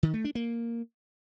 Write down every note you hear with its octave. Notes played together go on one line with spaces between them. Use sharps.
D#3
A3
D4
A#3